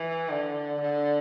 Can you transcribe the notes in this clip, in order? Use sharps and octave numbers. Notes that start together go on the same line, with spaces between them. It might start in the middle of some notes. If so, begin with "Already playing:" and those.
Already playing: E3
D3
D3